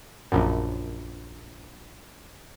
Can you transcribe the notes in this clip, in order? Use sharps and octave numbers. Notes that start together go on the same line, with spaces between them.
A#1 F#2